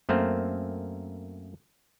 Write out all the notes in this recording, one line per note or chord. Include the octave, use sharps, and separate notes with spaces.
F#2 A3 A#3 C4 C5